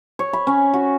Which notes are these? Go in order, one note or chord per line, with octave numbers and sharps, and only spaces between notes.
C#5
B5
C#4
F#4